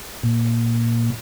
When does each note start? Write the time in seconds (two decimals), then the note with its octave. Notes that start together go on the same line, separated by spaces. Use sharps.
0.23 A#2